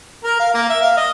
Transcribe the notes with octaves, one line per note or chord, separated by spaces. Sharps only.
A#4
F5
A#3
E5
F5
D#5